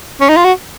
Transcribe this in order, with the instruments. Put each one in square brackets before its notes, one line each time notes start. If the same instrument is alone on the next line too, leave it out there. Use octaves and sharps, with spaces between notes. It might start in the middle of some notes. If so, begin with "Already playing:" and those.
[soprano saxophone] C#4
D#4
F4
F#4